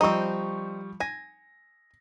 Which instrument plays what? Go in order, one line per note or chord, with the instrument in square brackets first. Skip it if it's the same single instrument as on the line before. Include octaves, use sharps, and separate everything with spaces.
[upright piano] F3 G3 C#6 [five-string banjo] C4 D#4
[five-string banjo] G#5 [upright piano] A#6